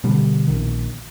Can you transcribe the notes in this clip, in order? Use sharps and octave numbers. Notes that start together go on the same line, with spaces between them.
B2 D3 G3
A#1 D#3